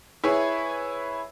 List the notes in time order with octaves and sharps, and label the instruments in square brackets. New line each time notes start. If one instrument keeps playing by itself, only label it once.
[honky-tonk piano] E4 G#4 B4 C#5